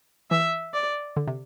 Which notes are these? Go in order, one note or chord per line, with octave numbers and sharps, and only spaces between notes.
E3 E5
D5
D3
C3